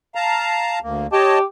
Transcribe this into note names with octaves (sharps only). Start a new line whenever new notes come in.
F5 A5 A#5
D2 A#3
G4 C#5 D#5 A5